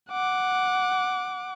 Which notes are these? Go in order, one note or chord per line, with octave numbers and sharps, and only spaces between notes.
F#5 D6